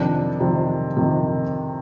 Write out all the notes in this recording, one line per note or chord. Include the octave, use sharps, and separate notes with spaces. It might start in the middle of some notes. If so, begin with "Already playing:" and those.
Already playing: F2 C3 D#3 D4
F2 C3 D#3
F2 C3 D#3